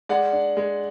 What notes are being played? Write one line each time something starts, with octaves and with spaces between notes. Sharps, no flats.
G#3 D5 F#5
D4
G#3